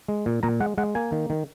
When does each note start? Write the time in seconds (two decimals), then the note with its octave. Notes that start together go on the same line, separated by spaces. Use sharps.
0.08 G#3
0.26 A#2
0.43 A#2 A#5
0.60 G#3 F#5
0.78 G#3 F#5
0.95 A#3 G#5
1.12 D#3
1.30 D#3